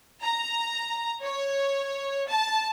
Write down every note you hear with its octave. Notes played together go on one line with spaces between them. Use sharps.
A#5
C#5
A5